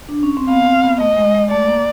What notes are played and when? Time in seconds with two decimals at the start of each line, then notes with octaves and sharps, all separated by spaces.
0.09 D4
0.23 C#4
0.37 C4
0.49 B3 F5
0.66 C4
0.84 B3
1.00 A3 D#5
1.17 G#3
1.34 G#3
1.51 A3 D5
1.68 A#3